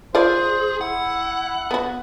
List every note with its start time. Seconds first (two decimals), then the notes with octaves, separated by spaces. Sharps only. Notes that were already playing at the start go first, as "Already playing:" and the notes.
0.15 F4 G#4 A#4 C5 D5
0.81 E4 F#5
1.71 B3 F#4